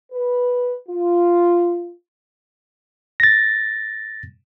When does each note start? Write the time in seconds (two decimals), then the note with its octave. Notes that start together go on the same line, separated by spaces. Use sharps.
0.12 B4
0.89 F4
3.20 A6 A#6